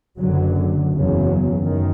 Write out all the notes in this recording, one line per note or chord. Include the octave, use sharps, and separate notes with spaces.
F#1 F#2 D3 F#3
F#1 E2 C#3 F#3
F#2 D#3